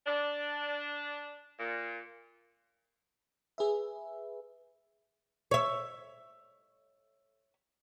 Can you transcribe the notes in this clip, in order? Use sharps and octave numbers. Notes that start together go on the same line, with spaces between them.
D4
A#2
G#4 B4 E5
C#5 E5